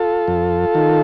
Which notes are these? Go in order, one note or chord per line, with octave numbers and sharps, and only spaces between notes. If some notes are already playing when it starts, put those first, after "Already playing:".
Already playing: F4 A4
F2
D#3